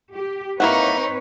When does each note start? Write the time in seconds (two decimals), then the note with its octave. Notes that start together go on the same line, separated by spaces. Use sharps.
0.14 G4
0.60 A#3 C4 D#4 E4 B4 C#5 F#5